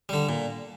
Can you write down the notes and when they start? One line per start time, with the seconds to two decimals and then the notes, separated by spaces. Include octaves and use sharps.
0.09 D3 G3
0.29 A#2